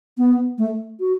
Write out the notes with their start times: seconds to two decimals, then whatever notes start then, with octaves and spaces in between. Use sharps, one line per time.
0.18 B3
0.58 A3
1.00 F#4